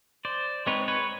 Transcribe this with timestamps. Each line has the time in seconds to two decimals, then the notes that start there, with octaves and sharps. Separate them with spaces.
0.25 C5 D5
0.66 G#3 C4 D#4 B4 C#5
0.88 B4 C#5